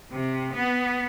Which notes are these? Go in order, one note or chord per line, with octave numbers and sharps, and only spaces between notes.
C3
B3